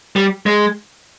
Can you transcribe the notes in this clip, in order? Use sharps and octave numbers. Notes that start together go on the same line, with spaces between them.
G3
G#3